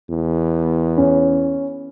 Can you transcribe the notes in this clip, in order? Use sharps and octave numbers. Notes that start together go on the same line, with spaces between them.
E2
C#4